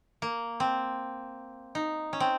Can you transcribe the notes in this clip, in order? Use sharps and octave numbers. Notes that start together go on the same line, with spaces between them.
A#3
C4
D#4
C#4
C4